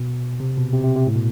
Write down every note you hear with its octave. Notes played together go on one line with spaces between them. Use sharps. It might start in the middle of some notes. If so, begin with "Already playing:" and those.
Already playing: B2
C3
B2
C3
C3
C3
A2
B2